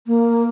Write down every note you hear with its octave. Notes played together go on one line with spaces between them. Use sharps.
A#3